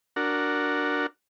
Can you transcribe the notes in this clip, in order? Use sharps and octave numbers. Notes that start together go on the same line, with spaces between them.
D4 F#4 A#4